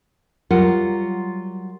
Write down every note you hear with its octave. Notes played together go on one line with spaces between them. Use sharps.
F#3 G3 F4 A#4 F#5